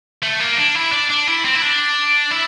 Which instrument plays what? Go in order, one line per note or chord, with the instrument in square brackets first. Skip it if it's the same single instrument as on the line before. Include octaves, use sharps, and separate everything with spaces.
[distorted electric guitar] A3
A#3
D4
E4
D4
D4
E4
C4
E4
D4
E4